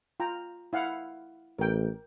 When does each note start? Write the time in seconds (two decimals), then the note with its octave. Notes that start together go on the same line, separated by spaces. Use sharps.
0.20 F4 G5 A#5
0.73 E4 F5 F#5
1.58 A1 A#4 G5